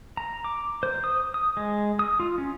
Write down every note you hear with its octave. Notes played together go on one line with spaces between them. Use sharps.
A#5
D6
C5
D#6
D#6
G#3
D#6
F4
C#4